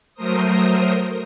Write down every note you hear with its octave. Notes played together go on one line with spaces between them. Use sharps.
F#3 A3 A#4 C5 D#6